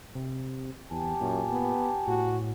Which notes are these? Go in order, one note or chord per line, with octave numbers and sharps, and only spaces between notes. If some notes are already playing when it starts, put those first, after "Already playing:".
C3
E2 G4 G#5 A5
F#2 A#2
B3
A2 F#4